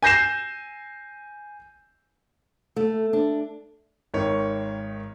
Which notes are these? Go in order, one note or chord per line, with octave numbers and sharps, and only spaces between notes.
G#5 G6 A#6 C7 E7
A3
D4
G#1 D#3 C#5